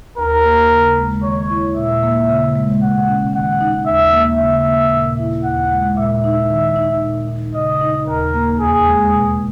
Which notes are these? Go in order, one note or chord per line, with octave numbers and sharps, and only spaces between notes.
D#2 A#4
A#3
C#3
G#3
D#3 C#5
E4
A#2 E5
A#3
C#3
G#3
B2 F#5
C#4
D#3 F#5
D#4
D#2 E5
A#3
C#3 E5
A#3
A#2
E4
D#2 F#5
G#3
A#2 E5
D#4
D#3
D#4
A#2
D#4
C#3 D#5
D#4
D#2 A#4
A#3
E2 G#4
G#3
B2